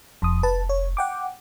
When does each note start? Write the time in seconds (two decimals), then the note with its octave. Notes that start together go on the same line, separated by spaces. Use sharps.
0.22 F1 F2 D#6
0.43 B4 A5
0.69 C#5
0.97 F#5 G5 D6